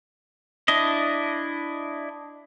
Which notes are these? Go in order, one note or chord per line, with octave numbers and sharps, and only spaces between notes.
D4 E4 D#5